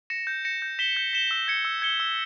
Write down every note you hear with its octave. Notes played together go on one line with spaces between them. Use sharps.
A#6 C#7 E7
G6
A#6 C#7 E7
G6
B6 E7 G7
G6
B6 E7 G7
E6
G#6 C#7 G7
E6
G#6 C#7 G7
E6